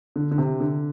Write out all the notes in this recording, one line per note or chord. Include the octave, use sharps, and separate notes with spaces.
D3
D3
C3
D3